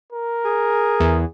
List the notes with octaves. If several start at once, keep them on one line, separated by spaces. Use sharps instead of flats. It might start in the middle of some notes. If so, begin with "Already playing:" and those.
A#4
G#4
E2